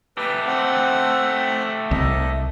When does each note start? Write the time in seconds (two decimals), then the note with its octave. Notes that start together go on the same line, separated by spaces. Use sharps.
0.18 A3 G4 B4
0.47 C4 F#5
1.91 C2 D#5